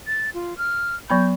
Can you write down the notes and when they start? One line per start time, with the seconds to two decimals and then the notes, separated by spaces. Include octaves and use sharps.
0.07 A6
0.34 F4
0.58 F6
1.10 F#3 B3 B5 G6